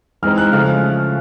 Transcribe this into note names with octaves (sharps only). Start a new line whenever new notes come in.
E3 G#3 C4 D#4 F6
F#6
C#3 F3 A3 F6